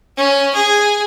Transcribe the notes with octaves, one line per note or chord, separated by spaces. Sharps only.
C#4
G#4